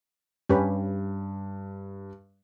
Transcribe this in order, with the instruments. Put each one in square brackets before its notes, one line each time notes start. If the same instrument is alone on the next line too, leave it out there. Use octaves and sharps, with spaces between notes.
[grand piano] G2 [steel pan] C#4 G4 B4